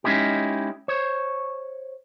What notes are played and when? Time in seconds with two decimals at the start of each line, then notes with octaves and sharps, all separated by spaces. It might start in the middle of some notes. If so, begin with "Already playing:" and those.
0.04 G#3 C#4 D#4 E4 G4
0.88 C5 C#5